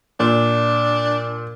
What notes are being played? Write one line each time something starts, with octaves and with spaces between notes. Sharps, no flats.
A#2 D4